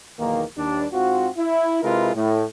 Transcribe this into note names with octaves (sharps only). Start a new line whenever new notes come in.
B1 E2 D#3 A#3
D#2 G3 D4
G#2 C4 F4 F#4
E4
C3 G#3 E4 F4 A#4 B4
A2